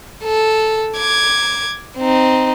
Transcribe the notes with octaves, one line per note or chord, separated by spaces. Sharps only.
A4
D6 G#6
C4 D#4